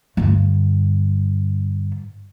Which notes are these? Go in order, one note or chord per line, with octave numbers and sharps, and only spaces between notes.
G2 D3